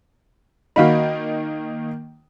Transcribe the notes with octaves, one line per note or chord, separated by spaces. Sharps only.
D#3 A#3 D#4 F#4 F5 B5